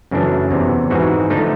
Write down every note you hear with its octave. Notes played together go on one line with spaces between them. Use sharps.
F#2 C#3 E3 A3 D4
E2 C3 E3
G#2 E3 G#3 C4 F#4
D3 F3 A3 D#4